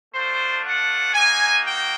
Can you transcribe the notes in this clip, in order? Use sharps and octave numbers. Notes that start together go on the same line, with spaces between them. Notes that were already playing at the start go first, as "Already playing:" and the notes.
A3 D4 F4 C5
F#5
A#3 D#4 F#4 G#5
G5